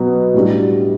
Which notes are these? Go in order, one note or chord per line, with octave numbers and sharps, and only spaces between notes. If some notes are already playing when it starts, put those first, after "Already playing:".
Already playing: B2 F#3 B3
A2 G3 D4